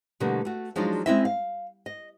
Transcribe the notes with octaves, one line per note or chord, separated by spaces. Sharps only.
B2 D3 G3 A3 A#3
A3 F#4
F3 F#3 G#3 D4 D#4 F4
G#3 C4 C#4 E4 D#5 E5
F5
D#5